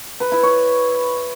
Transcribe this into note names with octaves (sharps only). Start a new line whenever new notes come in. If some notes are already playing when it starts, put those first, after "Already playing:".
B4
E4
C#5